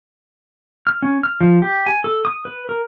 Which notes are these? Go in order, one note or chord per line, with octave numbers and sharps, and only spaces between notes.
F6
C#4
F6
F3
G4
G#5
A4
D#6
B4
A#4